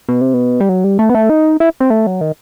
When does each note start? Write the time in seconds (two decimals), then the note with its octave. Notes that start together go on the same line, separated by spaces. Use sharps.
0.09 B2
0.21 C3
0.34 B2
0.60 G3
0.69 F#3
0.84 G3
0.99 A3
1.09 B3
1.15 A3
1.29 D#4
1.60 E4
1.80 C4
1.90 A3
2.07 F#3
2.21 D#3